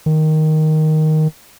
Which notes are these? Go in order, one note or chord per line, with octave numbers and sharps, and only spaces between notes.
D#3